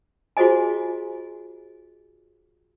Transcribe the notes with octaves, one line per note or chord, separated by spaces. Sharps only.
F4 F#4 G#4 C5 D#5 G#5